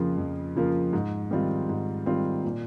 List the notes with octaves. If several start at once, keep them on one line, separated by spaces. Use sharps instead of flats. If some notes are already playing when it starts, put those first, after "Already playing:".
Already playing: F2 C#3 F3 A#3 F4
F2
C#3 F3 A#3 F4
G#2
D#3 G3 C4 F4
G#2
D#3 G3 C4 F4
A#2